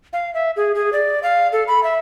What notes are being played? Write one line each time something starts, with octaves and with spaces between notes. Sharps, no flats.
F5
E5
G#4
G#4
D5
F5
A4
B5
E5